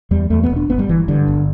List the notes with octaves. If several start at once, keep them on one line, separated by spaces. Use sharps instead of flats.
E2 G3
E2 A3
B3
E1
D4
G1 B3
G3
G1 E3
G2 D3
G1